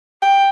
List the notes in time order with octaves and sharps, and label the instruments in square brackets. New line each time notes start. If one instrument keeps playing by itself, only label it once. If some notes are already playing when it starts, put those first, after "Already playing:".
[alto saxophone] G5